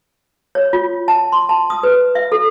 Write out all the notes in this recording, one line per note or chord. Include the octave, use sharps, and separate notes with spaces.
C#5
F4
A5
C6
A5
D#6
B4
E5
A4